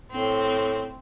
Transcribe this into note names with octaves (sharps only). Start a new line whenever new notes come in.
A2 C4